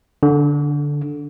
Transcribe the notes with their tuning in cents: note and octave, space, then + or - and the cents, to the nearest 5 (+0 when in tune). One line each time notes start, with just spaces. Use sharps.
D3 -10